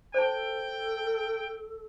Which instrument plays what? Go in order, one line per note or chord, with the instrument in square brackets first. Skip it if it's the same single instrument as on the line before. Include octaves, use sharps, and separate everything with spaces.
[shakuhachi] A4 [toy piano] C5 A5 [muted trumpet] G5